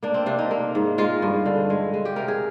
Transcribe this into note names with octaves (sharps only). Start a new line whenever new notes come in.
A#3 D4
C4
C3 D4
D#4
A#3
G#2
G#3 F4
G2
D3
G#3
G#3
G4
C3 A#4
G#4